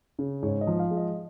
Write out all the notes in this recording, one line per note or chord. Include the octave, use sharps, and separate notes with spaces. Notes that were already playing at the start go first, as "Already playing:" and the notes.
C#3
G#2 C#5
D#5
F3
F5
G#3
D#5